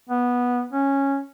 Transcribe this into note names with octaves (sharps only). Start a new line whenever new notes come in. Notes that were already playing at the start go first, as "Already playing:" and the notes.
B3
C#4